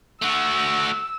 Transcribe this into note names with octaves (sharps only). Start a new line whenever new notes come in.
A3 F#4 E6